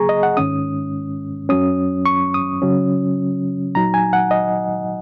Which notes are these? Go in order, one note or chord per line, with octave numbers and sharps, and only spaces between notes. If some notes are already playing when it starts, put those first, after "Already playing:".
Already playing: C#3 F#3 A#3 G#4 G#5 A#5 C#6
D#5
F#5
G#2 D#3 G#3 C#4 D#6
F#2 F#3 C#4 D#6
C#6
D#6
C#3 F#3 C#4
A#2 F#3 D#4 A#5
G#5
F#5
D#5